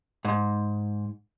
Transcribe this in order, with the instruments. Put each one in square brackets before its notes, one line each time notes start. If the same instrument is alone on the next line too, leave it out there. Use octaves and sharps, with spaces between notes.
[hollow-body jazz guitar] G#2